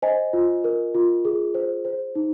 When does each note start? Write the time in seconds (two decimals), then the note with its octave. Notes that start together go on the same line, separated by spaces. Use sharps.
0.02 C5 D#5 G#5
0.33 F4
0.64 A#4
0.95 F4
1.25 G#4
1.54 C5
1.85 C5
2.15 D#4